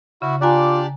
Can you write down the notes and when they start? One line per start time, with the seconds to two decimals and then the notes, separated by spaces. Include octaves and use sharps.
0.22 C#3 E4 F#4
0.41 D4 F4 G4 D5 G#5 A#5 F#6